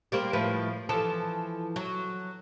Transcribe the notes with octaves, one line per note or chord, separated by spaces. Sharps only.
G3 A#3 C4
A2 F3 B4
E3 F3 A4
F#3